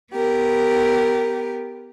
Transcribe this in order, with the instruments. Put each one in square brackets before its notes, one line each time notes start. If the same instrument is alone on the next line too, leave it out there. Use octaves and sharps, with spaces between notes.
[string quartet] B3 G4 A#4